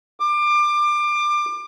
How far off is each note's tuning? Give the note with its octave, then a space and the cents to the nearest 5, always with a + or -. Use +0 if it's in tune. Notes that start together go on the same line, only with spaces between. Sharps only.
D6 +25